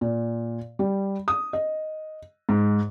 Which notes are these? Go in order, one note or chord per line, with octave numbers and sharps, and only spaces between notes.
A#2
G3
D#6
D#5
G#2